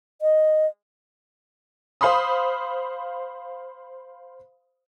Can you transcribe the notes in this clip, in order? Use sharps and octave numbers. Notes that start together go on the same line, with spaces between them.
D#5
C5 F5 B5 C6 D#6